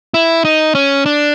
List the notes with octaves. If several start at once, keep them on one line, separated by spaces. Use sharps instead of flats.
E4
D#4
C#4
D4